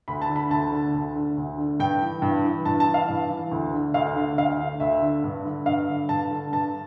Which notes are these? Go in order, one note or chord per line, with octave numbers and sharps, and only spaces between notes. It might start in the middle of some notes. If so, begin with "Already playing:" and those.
D2 B5
A5
D3
B5
D2 A5
D3
D2
D3
D2
D3
G2 G5
E3
G2
E3
G2 A5
A5
E3
F5
G2
E3
D2
D3
D2 F5
D3
D2 F5
D3
D2 E5
D3
G2
D3
G2 F5
D3
G2 A5
D3
G2 A5